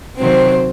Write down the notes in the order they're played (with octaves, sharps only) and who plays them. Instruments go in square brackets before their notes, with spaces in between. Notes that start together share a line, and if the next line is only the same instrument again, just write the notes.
[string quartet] C3 D#3 F#3 C4 C5